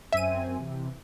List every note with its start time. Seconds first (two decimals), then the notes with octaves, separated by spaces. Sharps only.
0.13 F#2 C4 E5 G#5 D#7
0.59 C3 E3